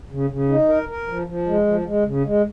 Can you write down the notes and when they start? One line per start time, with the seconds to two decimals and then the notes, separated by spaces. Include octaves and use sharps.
0.11 C#3
0.30 C#3
0.49 D#4
0.69 A#4
0.89 A#4
1.08 F3
1.27 F3
1.47 G#3
1.66 F3
1.86 G#3
2.05 C#3
2.24 G#3